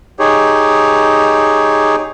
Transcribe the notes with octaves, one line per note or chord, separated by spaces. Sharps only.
D#4 G4 G#4 C#5